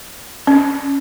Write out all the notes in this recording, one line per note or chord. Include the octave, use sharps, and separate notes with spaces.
C#4